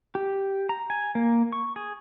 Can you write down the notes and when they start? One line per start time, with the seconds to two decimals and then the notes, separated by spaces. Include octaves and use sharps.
0.15 G4
0.69 A#5
0.90 G#5
1.15 A#3
1.52 C#6
1.76 G#4